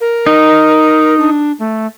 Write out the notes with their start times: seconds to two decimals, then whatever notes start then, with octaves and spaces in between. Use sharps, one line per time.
0.01 A#4
0.26 D#4
1.18 D4
1.59 A3